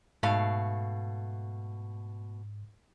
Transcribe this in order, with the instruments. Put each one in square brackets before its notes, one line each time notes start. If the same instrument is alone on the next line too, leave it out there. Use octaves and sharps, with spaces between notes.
[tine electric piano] G#2 [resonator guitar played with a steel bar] B2 A3 F5